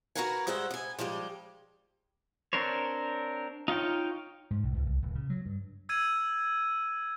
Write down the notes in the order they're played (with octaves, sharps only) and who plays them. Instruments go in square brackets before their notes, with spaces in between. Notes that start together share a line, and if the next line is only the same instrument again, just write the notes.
[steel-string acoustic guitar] F#4 G4 A#4 B4 F#5 G#5
G3 G#3 C5 E5 F#5
B3 G#5
F3 G3 G#3 G4
[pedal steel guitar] C4 D4 A#4 C5 C#5
D#4 F4 C#5 G5
[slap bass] G#2
B1
C#2
C2
D1
C#3
F#3
G2
[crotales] E6 G#6 D#7